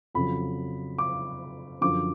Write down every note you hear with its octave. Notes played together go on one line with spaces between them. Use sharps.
F2 C#3 F#3 B5
D6
F#2 D3 F3 D6